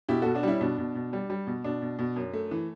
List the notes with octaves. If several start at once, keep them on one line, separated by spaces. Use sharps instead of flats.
B2 E4 G4
B2 F#4 A4
D4 F#4
G3 C#4 E4
B2 D4
B2
B2
G3
G3
B2
B2 D4
B2
B2
F#2
A3
E3